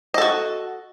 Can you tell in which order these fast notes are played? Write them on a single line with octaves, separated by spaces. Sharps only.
D#5 A4 F#4